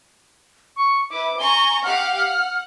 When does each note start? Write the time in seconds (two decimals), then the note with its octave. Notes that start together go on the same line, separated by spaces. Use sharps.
0.76 C#6
1.10 E4 B4 D6
1.39 G#5 A#5 C#6 G7
1.83 G4 F5 F#5 F6
2.17 F#5